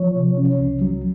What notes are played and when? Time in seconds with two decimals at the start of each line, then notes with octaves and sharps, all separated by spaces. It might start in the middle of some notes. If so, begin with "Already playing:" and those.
Already playing: F3 C#5
0.16 C3
0.37 C#4
0.60 C2
0.81 F#3